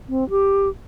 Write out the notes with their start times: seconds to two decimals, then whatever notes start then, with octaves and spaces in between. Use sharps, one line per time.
0.08 C4
0.30 G4